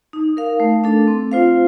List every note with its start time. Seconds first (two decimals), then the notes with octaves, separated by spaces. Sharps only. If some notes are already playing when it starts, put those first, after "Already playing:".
0.13 D#4
0.37 A#4 F5
0.60 A3
0.84 D4 A4
1.07 C4
1.32 F4 C5 F5